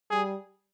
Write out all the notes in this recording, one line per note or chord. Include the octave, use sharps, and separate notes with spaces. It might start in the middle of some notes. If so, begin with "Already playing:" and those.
G3 G#4